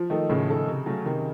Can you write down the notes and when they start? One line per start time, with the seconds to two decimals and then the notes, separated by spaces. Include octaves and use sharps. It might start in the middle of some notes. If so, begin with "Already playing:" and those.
Already playing: F3
0.10 D#3 A3 D#4 A4
0.30 A2 C#3
0.49 A3 D#4 A4
0.68 C3
0.86 F#3 A3 C#4
1.06 C3 D#3